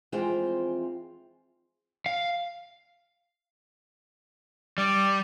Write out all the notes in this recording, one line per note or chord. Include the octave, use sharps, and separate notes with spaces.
F2 E3 G#3 C4 F4 G5
F5
G3 D5